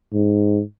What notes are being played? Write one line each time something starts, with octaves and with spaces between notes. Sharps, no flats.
G#2